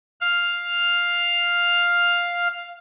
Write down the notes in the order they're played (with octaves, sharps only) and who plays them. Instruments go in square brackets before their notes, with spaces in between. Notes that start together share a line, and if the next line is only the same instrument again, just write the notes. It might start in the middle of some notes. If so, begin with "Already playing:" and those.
[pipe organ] F5 F6